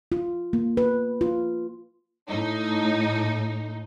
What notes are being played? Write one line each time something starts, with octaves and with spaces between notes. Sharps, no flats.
F4
A#3
B4
F4
A2 D#4